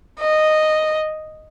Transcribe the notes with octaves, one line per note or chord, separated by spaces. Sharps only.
D#5